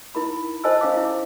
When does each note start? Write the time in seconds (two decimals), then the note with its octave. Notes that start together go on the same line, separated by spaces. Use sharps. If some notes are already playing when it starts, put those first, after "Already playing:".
0.15 D#4 E4 A#4 B5
0.64 A4 C5 D#5 G#5 A5 E6
0.81 C#4 C#5 F5 D6
0.97 E4